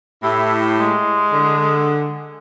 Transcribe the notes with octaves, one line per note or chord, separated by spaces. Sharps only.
A2 E4 G4
G#3
D3